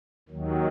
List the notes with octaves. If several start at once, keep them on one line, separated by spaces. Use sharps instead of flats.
D#2 D#3 F#3